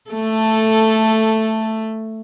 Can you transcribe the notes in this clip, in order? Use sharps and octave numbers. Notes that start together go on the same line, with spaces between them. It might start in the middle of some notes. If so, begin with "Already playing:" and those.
A3 A4